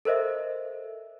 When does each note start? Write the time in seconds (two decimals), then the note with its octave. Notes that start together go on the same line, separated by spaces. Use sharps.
0.05 A4 A#4 C5 D#5 E5